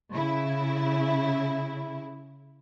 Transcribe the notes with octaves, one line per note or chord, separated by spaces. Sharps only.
C#3 E4